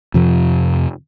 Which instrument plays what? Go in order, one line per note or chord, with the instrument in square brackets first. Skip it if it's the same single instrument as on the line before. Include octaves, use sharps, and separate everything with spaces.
[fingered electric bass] F2 C3 F3